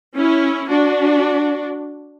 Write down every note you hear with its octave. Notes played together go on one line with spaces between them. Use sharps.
C#4 E4
D4 F#4